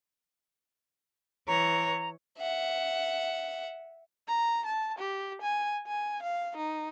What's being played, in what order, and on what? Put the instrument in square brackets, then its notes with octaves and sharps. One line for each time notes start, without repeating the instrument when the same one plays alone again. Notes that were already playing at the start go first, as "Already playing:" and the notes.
[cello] E3 C#5 [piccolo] A#5
[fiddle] E5 F#5
[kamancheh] A#5
A5
G4
G#5
G#5
F5
D#4